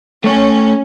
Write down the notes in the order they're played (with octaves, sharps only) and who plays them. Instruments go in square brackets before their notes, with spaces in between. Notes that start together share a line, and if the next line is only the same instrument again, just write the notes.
[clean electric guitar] A3 C#5 [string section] C#4